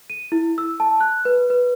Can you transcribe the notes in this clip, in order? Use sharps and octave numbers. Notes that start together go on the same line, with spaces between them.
D#7
E4
E6
A5
F#6
B4
B4